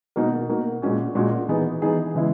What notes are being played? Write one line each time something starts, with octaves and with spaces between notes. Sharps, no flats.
B2 A#3 D#4 F#4 A#4
B2 A#3 D#4 F#4 A#4
A#2 G#3 C#4 F#4
A#2 G#3 C#4 F#4
E3 B3 D#4 G#4
E3 B3 D#4 G#4
C#3 E3 G#3 B3 E4